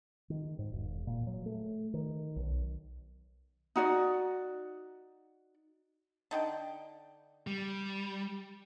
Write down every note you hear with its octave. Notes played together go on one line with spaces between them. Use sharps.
D#3
G#2
E1
A#2
F#3
A3
D#3
B1
D#4 F#4 D5
D3 D#4 G5
G3